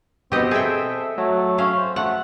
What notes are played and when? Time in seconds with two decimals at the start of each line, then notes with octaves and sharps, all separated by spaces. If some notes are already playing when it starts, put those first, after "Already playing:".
0.32 B2 B3 C4 G4 D#5
0.51 G#4 A4 E5 G5
1.18 F#3 A3
1.58 C#4 F5
1.77 C5
1.96 A3 F#5